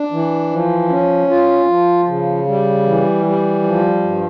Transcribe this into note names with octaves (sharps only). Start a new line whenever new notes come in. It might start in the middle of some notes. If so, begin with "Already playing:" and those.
Already playing: D4
E3
F3
C#4
F4
F3
C#3
G3
E3
G3
F3
G2